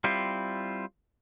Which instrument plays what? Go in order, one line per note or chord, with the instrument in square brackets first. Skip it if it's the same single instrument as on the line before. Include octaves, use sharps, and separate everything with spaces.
[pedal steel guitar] G3 C4 E4 F4